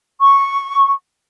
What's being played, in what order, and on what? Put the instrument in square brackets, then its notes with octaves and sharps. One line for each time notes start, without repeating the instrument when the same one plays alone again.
[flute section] C#6